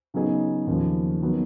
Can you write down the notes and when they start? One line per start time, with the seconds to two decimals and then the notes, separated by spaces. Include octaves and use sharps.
0.14 C#3 F#3 B3 D#4 G#4
0.67 D#2 C#3 F3
1.21 D#3 F#3 B3